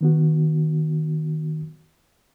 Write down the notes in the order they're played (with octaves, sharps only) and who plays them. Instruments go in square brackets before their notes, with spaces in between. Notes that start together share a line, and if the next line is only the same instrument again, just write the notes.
[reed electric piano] D#3 B3 F#4